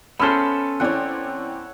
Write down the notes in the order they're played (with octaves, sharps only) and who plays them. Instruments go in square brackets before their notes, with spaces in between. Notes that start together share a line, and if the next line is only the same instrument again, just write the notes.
[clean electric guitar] B3 C#4 C5 [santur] A4 E5 [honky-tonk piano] B5 F6
[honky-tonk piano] E3 C4 D5 [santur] C#5 F#5